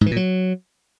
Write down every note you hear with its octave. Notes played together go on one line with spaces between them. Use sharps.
G#2
E3
A#2
F#3